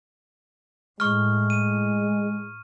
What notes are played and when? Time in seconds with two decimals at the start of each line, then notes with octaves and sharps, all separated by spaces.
1.00 A2 G#3 C#6 F6
1.50 D#7